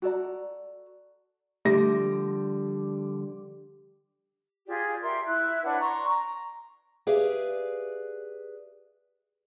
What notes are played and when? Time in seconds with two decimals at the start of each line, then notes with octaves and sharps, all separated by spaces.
0.02 F#4 A4 D5 A#5
1.65 D3 F3 G3 A3 G4 A#6
4.66 F4 G4 G#4 D5
5.02 G4 A#4 E5 C6
5.24 E4 F#6
5.63 D4 B4 C#5 F#5
5.80 A#5 C6 C#6
6.08 A#5
7.07 G4 G#4 B4 D5 E5 F5